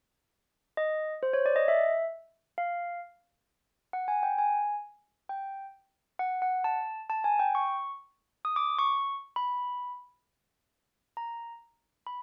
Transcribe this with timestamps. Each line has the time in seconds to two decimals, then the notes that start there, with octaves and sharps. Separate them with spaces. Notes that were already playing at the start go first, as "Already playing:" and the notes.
0.77 D#5
1.23 C5
1.33 C#5
1.46 D5
1.56 D#5
1.68 E5
2.58 F5
3.93 F#5
4.08 G#5
4.23 G5
4.38 G#5
5.29 G5
6.19 F#5
6.42 F#5
6.64 A5
7.10 A5
7.24 G#5
7.39 G5
7.55 C#6
8.45 D#6
8.56 D6
8.79 C#6
9.36 B5
11.17 A#5
12.07 B5